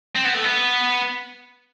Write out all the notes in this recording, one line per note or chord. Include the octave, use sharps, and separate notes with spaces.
C4
B3
A3
B3